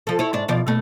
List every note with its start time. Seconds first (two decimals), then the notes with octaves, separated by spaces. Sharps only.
0.07 F3 A4
0.19 E4 C#5
0.33 G#2 D4
0.48 B2 F3 D5
0.67 B2 A3